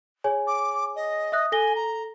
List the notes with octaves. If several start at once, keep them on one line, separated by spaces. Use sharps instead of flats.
G#4 C#5 G#5
D6
D#5
E5 D#6 F#6
A4 G#5 A#6 G7
A#5